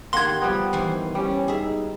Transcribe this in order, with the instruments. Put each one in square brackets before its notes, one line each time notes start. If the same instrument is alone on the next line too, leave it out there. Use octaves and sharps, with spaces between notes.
[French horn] D#3 [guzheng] A#3 G4 F#5 [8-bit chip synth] C6 G#6
[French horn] F3 [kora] G3 B3
[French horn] D#3 [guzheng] E3 C5 G#5
[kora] G3 [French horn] C#4
[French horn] D#4 [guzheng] G#4 E5